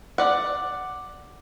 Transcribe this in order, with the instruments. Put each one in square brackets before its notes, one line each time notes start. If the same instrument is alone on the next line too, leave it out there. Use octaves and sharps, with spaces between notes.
[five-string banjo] D5 F#5